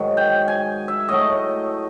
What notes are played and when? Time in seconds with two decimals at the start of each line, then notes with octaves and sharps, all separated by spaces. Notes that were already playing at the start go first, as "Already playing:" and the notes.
Already playing: G#2 D#3 F#3
0.17 G5
0.48 G#5
0.88 E5
1.08 A2 F#3 A3 D#5